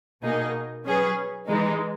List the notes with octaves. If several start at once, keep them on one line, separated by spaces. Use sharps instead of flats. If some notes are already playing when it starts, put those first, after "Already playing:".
B2 A#3 D#4 G#4 D#5
F#3 C#4 G#4 B4
E3 G#3 D#4